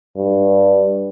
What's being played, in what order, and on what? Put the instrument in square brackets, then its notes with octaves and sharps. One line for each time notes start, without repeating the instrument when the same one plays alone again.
[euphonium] G2